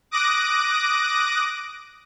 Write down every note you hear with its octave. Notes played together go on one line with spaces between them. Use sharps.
D6 D#6 F#6 A#6 D7